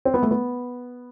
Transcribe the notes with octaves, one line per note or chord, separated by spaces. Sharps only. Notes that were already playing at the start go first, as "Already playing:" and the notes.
C4
B3
A3
B3